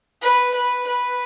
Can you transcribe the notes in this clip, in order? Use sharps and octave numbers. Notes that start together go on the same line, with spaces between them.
B4
B4
B4